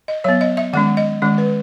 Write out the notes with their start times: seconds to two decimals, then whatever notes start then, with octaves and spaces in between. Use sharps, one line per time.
0.08 D#5
0.24 F#3 B3 C#5
0.41 D#5
0.57 E5
0.73 D#3 G#3 C#4 F#5
0.97 D#5
1.22 D#3 G#3 C#4
1.38 B4